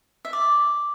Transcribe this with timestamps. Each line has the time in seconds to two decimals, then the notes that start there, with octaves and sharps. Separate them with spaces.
0.25 E5
0.33 D5